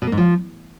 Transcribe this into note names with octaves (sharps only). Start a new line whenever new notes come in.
B2
A#3
G#2
F3